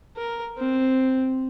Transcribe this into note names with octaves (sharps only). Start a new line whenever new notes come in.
A#4
C4